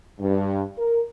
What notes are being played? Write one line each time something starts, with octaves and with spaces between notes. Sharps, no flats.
G2
A#4